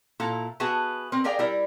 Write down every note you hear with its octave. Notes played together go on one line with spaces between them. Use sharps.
A#2 E4 A4 F5 A#5
B3 F#4 G#4 E5 A5
C4 A#4
G4 G#4 A#4 D5 F5 G5
G3 E4 A#4